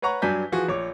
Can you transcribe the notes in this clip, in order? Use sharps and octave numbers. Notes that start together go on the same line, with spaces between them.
B4 C#5 F#5 A#5 C#6
G2 F#3 D4 G#5 G6 B6
E3 F3 F#4 G#4
A#1 C#5 D6